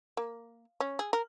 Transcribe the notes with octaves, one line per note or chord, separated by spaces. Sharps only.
A#3
C#4
G#4
A#4